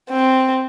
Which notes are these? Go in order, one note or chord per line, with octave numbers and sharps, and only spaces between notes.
C4